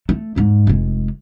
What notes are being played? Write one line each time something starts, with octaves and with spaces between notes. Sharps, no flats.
A3
D#2 G#2
F1 G#3